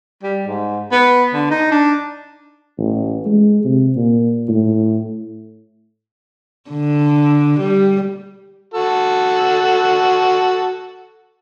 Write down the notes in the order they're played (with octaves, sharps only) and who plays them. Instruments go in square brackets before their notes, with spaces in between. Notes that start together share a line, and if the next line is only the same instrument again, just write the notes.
[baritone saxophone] G3
G#2
B3
D3
D#4
D4
[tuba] A1
G#3
C3
A#2
A2
[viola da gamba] D3
G3
[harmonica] F#4 A4